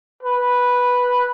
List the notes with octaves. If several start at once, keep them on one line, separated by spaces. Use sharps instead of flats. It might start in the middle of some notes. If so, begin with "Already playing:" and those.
B4